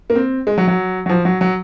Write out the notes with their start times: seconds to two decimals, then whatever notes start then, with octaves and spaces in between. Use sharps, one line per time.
0.10 A#3
0.15 C4
0.47 G#3
0.58 F#3
0.68 F#3
1.06 F#3
1.09 F3
1.25 F#3
1.41 F#3